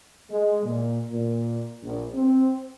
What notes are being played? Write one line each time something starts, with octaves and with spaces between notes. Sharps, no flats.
G#3
A#2
A#2
A#1
C4